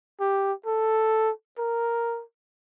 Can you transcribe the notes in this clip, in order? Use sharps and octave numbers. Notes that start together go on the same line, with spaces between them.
G4
A4
A#4